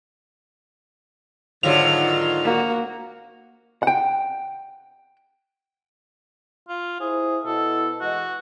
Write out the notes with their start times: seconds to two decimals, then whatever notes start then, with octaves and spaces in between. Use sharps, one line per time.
1.63 G#2 D3 D#3 F#3 F4 F7
2.44 A#3 F#4
3.83 F#5 G5
6.69 F4
7.00 E4 G#4 C5
7.45 B2 E4 A4
8.01 E3 G#3 F#4 D#5